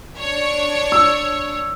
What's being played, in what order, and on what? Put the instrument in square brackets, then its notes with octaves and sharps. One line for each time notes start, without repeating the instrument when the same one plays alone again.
[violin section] D4 C#5
[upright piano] E6